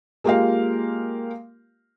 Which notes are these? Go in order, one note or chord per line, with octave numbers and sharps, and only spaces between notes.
G#3 A#3 F4 G4 A#4 F5